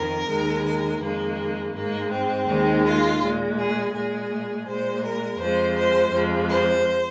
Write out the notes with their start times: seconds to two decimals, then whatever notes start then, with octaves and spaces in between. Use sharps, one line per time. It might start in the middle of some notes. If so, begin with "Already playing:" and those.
Already playing: F2 D#3 A#4
0.27 D#2 D#3 G#3
0.64 A#4
1.00 F2 D#3 G#3 A#3
1.74 G#2 G#3 A#3
2.10 C4
2.46 D#2 D#3 G#3
2.83 F4
3.20 A#2 G#3
3.57 G#4
3.93 A#2 G#3 G#4
4.66 A#2 G#3 C5
5.03 A#4
5.38 F2 F3 G#3 C5
5.75 C5
6.12 F2 F3 G#3
6.48 C5